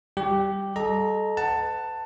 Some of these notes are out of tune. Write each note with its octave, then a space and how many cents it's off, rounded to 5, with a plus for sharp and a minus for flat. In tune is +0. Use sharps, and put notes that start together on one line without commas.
G3 +0 G4 +0
A4 -25 D#5 -20 A#5 +0
B4 +35 F#5 +10 A5 +15